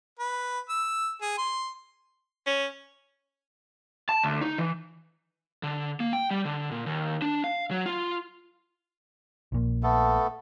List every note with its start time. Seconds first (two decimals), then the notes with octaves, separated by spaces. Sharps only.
0.19 B4
0.69 E6
1.22 G#4
1.38 C6
2.47 C#4
4.09 A5
4.24 D2
4.41 D#4
4.58 E3
5.63 D3
6.00 A#3
6.13 G5
6.31 G3
6.45 D3
6.72 A#2
6.86 D#2
7.22 D4
7.44 F5
7.71 F#3
7.86 F4
9.52 A#1 A#2
9.83 A3 B3 A4